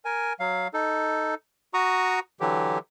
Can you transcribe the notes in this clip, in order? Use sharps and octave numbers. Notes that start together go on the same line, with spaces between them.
A#4 G#5
F#3 F5
D#4 A4
F#4 A#5 C#6 D#6
D3 E3 F#3 G4